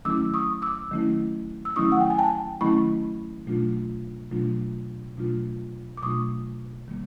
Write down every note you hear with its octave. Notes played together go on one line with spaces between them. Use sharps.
D#3 F#3 A3 C#4 E4 D6 E6
C#6 D#6
D6 E6
D#3 F#3 A3 C#4 E4
E6
D#3 F#3 A3 C#4 E4 C#6 D#6
F#5
G5
G#5
G5 A5
D#3 F#3 A3 C#4 E4 B5 C#6
B2 F#3 A3 D4 F4
B2 F#3 A3 D4 F4
B2 F#3 A3 D4 F4
D6
B2 F#3 A3 D4 F4 C#6 D#6
D#3 G3 A#3